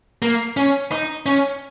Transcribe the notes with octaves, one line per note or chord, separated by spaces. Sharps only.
A#3
C#4
D#4
C#4